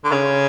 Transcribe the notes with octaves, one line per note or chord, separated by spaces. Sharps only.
D3
C#3